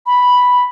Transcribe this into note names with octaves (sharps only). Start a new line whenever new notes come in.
B5